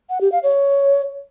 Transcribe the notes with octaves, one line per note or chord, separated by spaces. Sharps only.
F#5
G4
F5
C#5